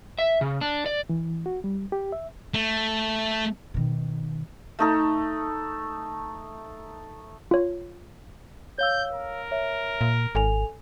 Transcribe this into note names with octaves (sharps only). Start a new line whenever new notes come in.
E5
C#3
D4
D5
E3
F#4
G3
G4
E5
A3
B2 D#3
A3 D#4 A4
F4 C#5
C#5 F5 E6 G6
A#4
C#5 E5
A#2
G#1 A4 G#5 F7